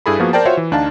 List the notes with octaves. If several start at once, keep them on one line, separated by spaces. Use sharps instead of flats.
G2 E4 G#4 A4 B5
F3 A#3 B3 F#4 G#4 F5
A#4 C5 D5 G5 A5
F4 F#4 C5 C#5 E5
E3
D2 D4 D#4 F5 A5